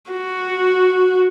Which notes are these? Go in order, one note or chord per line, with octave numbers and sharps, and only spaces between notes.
F#4